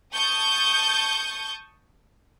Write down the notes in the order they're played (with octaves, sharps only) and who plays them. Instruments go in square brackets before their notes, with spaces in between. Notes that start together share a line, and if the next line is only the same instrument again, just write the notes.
[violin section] A5 C#6 D#6 G6